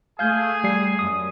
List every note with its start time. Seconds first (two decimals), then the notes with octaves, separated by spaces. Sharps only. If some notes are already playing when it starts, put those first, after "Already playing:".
0.19 A3 G#4 F5 G#5 G6
0.64 G3 C7
0.99 F#2 D#6